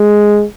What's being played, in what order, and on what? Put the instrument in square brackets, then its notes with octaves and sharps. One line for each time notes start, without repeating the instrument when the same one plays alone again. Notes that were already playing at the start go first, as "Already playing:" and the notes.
Already playing: [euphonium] G#3